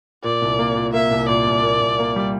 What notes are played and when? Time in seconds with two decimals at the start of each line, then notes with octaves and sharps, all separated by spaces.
0.23 A#2 D5
0.42 C2
0.59 A#3
0.76 A#2
0.93 A#3 E5
1.11 C2
1.28 A#2 D5
1.47 C2
1.63 A#2
1.81 C2
1.99 A#3
2.16 G3